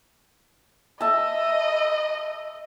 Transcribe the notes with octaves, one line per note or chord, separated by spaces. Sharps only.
D#5 E5 A5